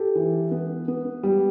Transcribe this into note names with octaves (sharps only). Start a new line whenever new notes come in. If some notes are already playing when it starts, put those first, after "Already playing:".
Already playing: G4 A4
E3
B3
B3
G3